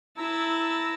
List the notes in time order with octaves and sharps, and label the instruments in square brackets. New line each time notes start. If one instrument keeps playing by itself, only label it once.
[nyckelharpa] E4 A5 [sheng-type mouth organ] A#5 E6